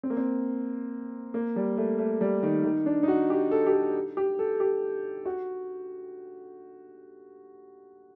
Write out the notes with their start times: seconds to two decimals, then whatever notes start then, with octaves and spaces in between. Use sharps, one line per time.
0.03 C4
0.10 A#3
0.17 C4
1.34 A#3
1.56 G3
1.78 A3
1.99 A3
2.21 G3
2.43 D#3
2.64 D#3
2.86 D4
3.03 D#4
3.08 F#4
3.30 G4
3.51 A4
3.67 G4
3.73 A4
4.17 G4
4.39 A4
4.60 G4
5.25 F#4